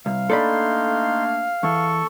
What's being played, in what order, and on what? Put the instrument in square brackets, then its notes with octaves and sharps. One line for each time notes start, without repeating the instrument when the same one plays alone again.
[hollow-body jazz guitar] C2 [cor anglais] F5
[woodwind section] A3 A#3 D4 [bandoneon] D#4 C6 [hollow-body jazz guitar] A4 D5 B5
[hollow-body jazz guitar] E2 [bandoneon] A4 C#6